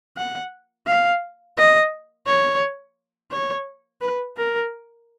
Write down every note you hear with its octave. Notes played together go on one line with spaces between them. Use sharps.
F#5
F5
D#5
C#5
C#5
B4
A#4